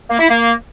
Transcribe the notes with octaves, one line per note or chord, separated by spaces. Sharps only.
A#3
E4
A#3